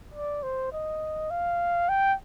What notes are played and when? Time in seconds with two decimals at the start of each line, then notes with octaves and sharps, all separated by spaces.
0.14 D5
0.43 C5
0.72 D#5
1.30 F5
1.89 G5